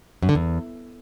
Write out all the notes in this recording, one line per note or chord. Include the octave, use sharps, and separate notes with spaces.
F#2
D3
E2